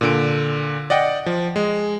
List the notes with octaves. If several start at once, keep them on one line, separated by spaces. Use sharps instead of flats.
A#2 D3 D7
D5 D#5 F#5 G5
F3
G#3